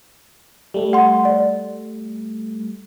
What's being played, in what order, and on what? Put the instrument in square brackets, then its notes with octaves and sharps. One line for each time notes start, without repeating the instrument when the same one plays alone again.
[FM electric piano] G3 A3
[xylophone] F#5 C6
D5